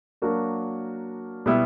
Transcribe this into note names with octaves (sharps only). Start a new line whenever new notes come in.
F#3 A#3 D4 F#4 A#4
B2 G3 B3 E4